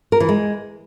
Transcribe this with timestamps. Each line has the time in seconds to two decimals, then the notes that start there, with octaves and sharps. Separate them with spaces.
0.12 A#4
0.20 E3
0.29 G#3